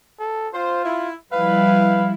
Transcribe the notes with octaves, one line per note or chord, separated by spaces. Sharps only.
A4
F4 C5
E4
F3 G3 E4 B4 F5